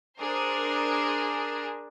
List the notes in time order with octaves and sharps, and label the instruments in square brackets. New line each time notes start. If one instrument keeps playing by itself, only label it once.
[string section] D4 G#4 A#4 C5